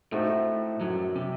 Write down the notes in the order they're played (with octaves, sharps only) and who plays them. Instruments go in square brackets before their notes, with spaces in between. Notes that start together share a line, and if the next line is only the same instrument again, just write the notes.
[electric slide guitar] A2 [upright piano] A3 C4 D#4 F#4
[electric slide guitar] F#2 F#3
C3